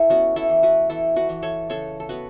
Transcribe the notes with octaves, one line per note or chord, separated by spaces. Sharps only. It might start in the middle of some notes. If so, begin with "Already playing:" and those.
Already playing: A3 E4 A4
B3 C#4 F#4
E4 A4
E3
F#4 B4
E3 E4 A4
F#4 B4
E3
A4 C#5
C#3 A4 C#5
A4
B3 F#4 B4